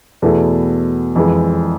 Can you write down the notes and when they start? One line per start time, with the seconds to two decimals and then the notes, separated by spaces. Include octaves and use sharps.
0.22 E2 B2 A3 E4 A4
1.16 F2 E3 G#3